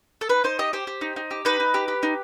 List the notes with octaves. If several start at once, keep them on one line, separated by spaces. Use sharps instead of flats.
A4
D#4 B4
D#4 C5
G4 D#5
G4 C5
G4
D#4
D#4
G4
D#4 B4
D#4
G4
G4
D#4